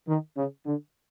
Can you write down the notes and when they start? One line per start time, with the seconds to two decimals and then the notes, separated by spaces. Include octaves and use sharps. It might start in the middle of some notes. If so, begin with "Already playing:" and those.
0.08 D#3
0.36 C#3
0.66 D3